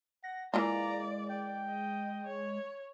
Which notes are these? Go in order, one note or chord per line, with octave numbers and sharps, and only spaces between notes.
F#5 A#6
E3 G#3 A#3 F4 D5 A#5
D5 G5
D#5
C#5